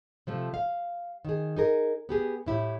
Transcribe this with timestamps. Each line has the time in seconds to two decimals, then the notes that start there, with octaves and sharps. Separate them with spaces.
0.27 C3 F3 A3
0.54 F5
1.25 D#3 G#4
1.56 D#4 G#4 A#4
2.09 B3 G4 G#4
2.46 A2 E4 G4